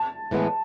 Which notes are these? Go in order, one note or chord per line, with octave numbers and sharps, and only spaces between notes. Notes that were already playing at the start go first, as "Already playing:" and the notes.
Already playing: A5
A2 E3 G#3 B3